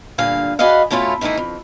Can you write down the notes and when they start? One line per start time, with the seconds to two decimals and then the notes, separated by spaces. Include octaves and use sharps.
0.18 G2 A#2 D3 F5 G#5
0.59 F#4 G#4 B4 D5 D#5 F5
0.90 B2 A3 C#4 E4 F4
1.21 D#3 E3 A3 D#4 E4
1.37 F2